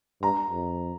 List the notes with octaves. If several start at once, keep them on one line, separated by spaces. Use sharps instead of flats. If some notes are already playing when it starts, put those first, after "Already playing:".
G2 A#5
F2